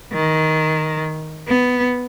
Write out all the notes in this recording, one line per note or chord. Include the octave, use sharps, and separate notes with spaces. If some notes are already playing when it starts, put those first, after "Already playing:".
D#3
B3